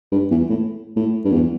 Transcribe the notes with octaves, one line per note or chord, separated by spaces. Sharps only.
G2
E2
A2
A2
G2
E2